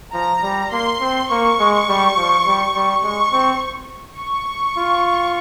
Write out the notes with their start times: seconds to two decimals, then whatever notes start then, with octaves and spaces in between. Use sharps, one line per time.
0.14 F3 A#5
0.43 G3
0.72 A#3 C6
1.01 C4
1.30 A#3 C#6
1.60 G#3
1.88 G3
2.17 F3
2.46 G3
2.75 G3
3.03 G#3 C#6
3.32 C4
4.19 C#6
4.78 F4